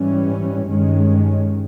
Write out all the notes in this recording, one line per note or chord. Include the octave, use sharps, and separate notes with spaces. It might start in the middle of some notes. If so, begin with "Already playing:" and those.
Already playing: G#2 E3 G3 C#4
G2 D#3 G#3 C#4